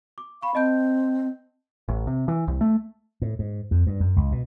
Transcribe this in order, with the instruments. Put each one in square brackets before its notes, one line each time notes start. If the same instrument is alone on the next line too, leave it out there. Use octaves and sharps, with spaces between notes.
[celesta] D6
[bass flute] F5 [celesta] B5 C#6
[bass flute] C4 [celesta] D#5 A5 G6
[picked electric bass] A1
C3
E3
C2
A3
[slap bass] A2
G#2
F2
G2
F#2
C#2
B2